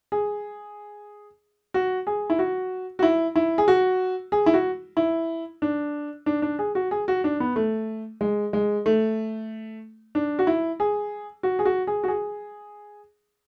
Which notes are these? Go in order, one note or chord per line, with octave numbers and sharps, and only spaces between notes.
G#4
F#4
G#4
E4
F#4
F#4
E4
E4
G#4
F#4
G#4
E4
F#4
E4
D4
D4
D4
G#4
F#4
G#4
F#4
D4
B3
A3
G#3
G#3
A3
D4
F#4
E4
G#4
F#4
G#4
F#4
G#4
F#4
G#4